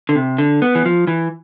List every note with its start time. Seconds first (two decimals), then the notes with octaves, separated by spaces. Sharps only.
0.09 D3
0.15 C3
0.38 D3
0.62 B3
0.75 E3
0.85 F3
1.07 E3